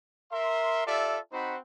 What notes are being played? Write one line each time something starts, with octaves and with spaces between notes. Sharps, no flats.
A#4 E5 C6
F4 G4 A4 D5 E5
C4 D#4 F#4 C5 F#5 B5